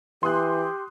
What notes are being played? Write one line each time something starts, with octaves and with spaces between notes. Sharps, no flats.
E3 G4 C6 D#6 F#6